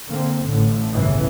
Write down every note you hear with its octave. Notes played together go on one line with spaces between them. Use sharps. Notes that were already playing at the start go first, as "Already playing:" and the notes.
D3 A#3 C4
A1 A2 D3
G1 C2 C#3 E3